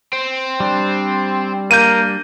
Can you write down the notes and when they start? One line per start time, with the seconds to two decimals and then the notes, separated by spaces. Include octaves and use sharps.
0.13 C4
0.60 G3 D4
1.71 A#3 G6 D#7